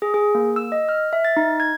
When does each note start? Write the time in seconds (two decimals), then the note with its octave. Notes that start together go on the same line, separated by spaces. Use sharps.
0.02 G#4
0.14 G#4
0.35 A#3
0.56 E6
0.72 D#5
0.89 F6
1.13 E5
1.25 A6
1.37 D#4
1.60 G#6